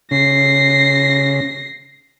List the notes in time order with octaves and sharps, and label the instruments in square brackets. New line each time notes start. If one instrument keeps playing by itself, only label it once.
[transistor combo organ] C#3 [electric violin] A#6 C7